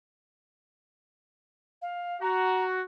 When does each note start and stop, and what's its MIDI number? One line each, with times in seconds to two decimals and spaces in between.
1.82 2.20 77
2.21 2.82 66
2.21 2.63 82